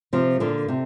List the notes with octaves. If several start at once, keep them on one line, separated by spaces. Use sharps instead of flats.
C3 F3
A#2 D3
C3